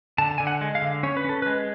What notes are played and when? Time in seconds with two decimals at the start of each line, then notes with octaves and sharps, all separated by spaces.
0.18 D3 A5
0.38 D3 G#5
0.47 F#5
0.61 G#3
0.75 F5
0.82 D3
1.03 C#4 C#5
1.17 B4
1.24 C#4 A4
1.42 G#3 B4